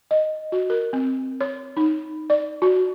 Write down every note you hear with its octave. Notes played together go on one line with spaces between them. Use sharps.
D#5
F#4
A#4
C4
C#5
D#4
D5
F#4